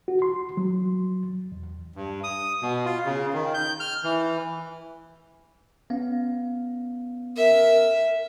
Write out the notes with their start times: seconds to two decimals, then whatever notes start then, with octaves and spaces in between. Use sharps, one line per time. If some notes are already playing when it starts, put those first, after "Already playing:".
0.08 F#4
0.22 C6
0.57 F#3
1.52 E2
1.96 G2
2.24 D#6
2.62 B2
2.85 F4
3.06 C#3
3.33 D#3
3.54 G6
3.80 F6
4.04 E3
5.90 B3 C#4 F5
7.37 A#4 E5